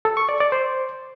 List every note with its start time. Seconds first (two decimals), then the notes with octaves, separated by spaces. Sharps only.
0.05 A4
0.17 C#6
0.29 D5
0.40 D5
0.52 C5